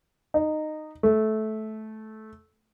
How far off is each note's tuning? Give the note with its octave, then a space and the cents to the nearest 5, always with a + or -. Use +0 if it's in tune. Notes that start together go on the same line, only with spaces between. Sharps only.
D#4 -15
A3 -15